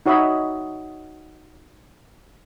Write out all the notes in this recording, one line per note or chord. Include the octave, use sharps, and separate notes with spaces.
D#4 F#4 C#5 D#5 E5 B5